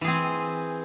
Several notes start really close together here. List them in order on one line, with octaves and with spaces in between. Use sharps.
E3 G#4 C4